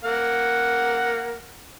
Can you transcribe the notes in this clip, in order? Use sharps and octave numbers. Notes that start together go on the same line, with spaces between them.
A#3 F#5